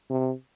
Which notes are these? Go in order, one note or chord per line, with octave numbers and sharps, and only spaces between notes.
C3